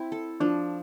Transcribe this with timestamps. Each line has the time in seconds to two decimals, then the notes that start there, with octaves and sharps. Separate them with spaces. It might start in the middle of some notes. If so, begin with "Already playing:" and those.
Already playing: C4 E4
0.12 A4
0.40 F3 D4